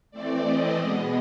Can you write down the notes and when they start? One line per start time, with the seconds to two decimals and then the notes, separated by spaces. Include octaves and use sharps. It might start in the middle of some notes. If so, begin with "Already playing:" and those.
0.11 E3 A3 C4 D5
0.44 D#5
0.77 B2 G#3 B3